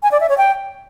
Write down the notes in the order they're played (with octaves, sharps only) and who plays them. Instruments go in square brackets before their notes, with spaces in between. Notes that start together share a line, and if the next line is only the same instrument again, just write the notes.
[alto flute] G#5
D5
E5
C#5
G5